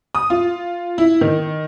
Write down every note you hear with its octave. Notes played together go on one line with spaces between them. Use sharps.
D#6
F4
E4
D#3